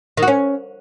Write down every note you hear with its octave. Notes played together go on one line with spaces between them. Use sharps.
D#3
F#4
C#4